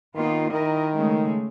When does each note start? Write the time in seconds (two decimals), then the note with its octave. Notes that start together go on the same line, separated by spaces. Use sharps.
0.15 D#3 A#3 B3 F4
0.51 D#3 E4 A#4 D#5
0.95 C#3 G#3 A3